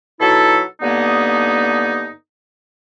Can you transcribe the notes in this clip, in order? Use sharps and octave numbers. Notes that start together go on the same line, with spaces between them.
B2 F#3 D#4 E4 A4
G2 D3 A#3 B3 D#4